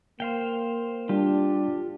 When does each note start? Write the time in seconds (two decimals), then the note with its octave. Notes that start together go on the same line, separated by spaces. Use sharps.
0.20 A#3 C5 F5 G5
1.09 G3 D4 F4 G4